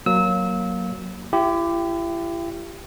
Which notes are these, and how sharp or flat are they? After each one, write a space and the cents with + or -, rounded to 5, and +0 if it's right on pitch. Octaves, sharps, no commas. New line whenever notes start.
F#3 +0 A#3 +5 E6 -30
E4 +40 G4 +0